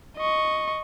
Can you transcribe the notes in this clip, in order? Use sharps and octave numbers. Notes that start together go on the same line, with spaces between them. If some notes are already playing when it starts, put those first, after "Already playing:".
D#5 C#6